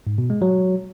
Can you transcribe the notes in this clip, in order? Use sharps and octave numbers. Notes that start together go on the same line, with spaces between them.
G#2
B2
G#3
F#3